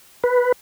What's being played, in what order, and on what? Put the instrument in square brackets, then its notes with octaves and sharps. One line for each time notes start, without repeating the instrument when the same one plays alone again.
[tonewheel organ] B4